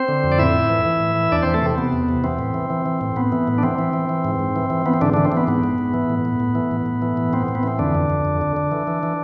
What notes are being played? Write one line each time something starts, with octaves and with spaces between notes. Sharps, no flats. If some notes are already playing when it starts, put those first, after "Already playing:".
Already playing: C4 C5
D3
F2
D5
A2 E4 E5
A2
E3
E3
A2
E3
E2 D4 D5
E3 C4 C5
A3 A4
C3 C4
C3 B3
E2
C3
E3 C4
A2
E3
E3
E3
A2
A2 B3
E3
A2
D4
E3 C4
E3
E3
E3
G#2
G#2
E3
E3
E3 B3
C4
G#2 D3 D4
D3 E3 D4
C4
E3
B3
G#2 B3
G#2
G#2
E3
A2
A2
A2
E3
A2
A2
E3
A2
A2 C4
A2
B3
E3 C4
F2 D3 D4
F2
F2
F2
D3
D3
E3
E3
E3